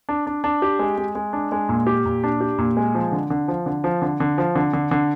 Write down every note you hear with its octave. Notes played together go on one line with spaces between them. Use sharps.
D4
D4
D4
G4
G#3
G#3
G#3
D4
G#3
A#2
G4
A#2
D4
G4
A#2
G#3
F3
D3
D3
F3
D3
F3
D3
D3
F3
D3
D3
D3